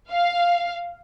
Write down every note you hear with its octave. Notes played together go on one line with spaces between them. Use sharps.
F5